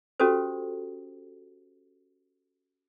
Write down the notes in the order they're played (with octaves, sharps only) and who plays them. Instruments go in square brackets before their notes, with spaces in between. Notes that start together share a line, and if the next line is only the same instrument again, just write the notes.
[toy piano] C#4 F#4 G4 A4 C5